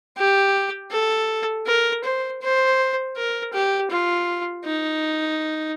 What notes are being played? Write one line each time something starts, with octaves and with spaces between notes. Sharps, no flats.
G4
A4
A#4
C5
C5
A#4
G4
F4
D#4